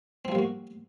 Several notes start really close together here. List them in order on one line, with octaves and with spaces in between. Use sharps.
C4 F3 G3 A#3 F#4